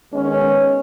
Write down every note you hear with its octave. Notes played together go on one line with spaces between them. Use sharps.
D#3 G#3 B3 C#4